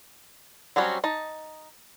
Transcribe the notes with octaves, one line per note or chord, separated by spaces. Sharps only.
F#3 G3 C4 C#4 F#4
D#4 A5